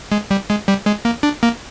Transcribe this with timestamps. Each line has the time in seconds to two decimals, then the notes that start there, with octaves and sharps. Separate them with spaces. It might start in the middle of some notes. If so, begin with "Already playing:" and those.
0.12 G#3
0.31 G3
0.50 G#3
0.68 G3
0.86 G#3
1.05 A#3
1.23 D4
1.43 A#3